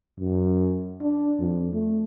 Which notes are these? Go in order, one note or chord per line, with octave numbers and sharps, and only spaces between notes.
F#2
D4
F2
A3